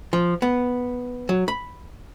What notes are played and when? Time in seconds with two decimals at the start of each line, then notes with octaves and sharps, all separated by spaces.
0.13 F3
0.42 B3
1.29 F#3
1.48 B5